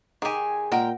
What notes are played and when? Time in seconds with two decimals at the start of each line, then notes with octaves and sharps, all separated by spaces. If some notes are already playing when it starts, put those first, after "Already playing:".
0.22 D#3 G4 G#4 G#5
0.72 A#2 G#3 A#4 F#5 G5